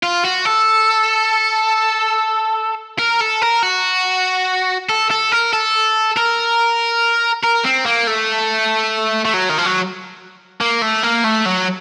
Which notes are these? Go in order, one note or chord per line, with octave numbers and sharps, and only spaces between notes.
F4
F#4
A4
A#4
A4
A#4
F#4
A4
A4
A#4
A4
A#4
A#4
C4
A#3
A3
A3
F#3
D#3
F3
F#3
A#3
A3
A#3
A3
F#3